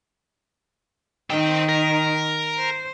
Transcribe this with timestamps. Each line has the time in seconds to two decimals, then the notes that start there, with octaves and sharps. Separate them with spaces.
1.30 D#3 C4 G5
1.69 A#4
2.58 C5